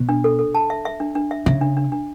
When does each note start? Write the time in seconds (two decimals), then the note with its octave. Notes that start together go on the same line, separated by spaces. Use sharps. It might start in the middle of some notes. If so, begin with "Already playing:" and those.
Already playing: B2
0.09 D4
0.24 A4
0.39 A4
0.55 A5
0.70 E5
0.85 E5
1.00 D4
1.15 D4
1.31 E5
1.46 C#3 E5
1.61 D4
1.77 D4
1.92 D4